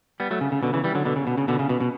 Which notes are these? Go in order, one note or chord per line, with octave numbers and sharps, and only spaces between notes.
G3 B3
F#3 A3
C#3
C#3
B2 D3
C#3 E3
E3 G3
D3 F#3
B2 D3
C#3
B2
C#3
B2 D3
C#3
B2
B2